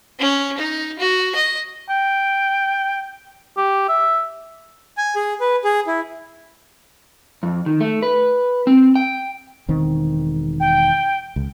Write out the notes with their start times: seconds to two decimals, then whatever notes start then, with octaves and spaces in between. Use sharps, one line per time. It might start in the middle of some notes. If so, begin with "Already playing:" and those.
0.19 C#4
0.58 D#4
0.99 F#4
1.35 D#5
1.90 G5
3.57 G4
3.89 E5
4.97 G#5
5.16 G#4
5.40 B4
5.64 G#4
5.87 E4
7.43 F2
7.66 D#3
7.80 A3
8.02 B4
8.67 C4
8.96 G5
9.69 E1 D#3 C4
10.60 G5
11.36 C#2